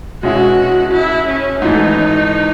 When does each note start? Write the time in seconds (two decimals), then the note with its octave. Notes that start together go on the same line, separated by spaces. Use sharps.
0.23 B2 G#3 C#4 E4 F#4
0.92 E4
1.28 C#4
1.61 G#2 E3 A3 D#4